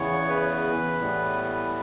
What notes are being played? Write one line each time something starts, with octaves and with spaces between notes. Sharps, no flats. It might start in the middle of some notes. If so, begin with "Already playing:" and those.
Already playing: E2 C#3 E3 B3 C#5
B4
A2 E3 G3 B3